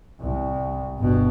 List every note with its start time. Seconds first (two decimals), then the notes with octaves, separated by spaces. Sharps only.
0.21 C2
0.98 G1 B2